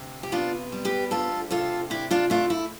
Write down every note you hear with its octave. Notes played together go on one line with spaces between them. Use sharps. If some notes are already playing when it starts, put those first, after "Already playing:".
Already playing: D2 C3
G4
B3 D4 F4
G3
G4 B4
D2 F4 A4
C3 F4 A4
D4 E4 G4
D4 F4
A3 D4 F4
E4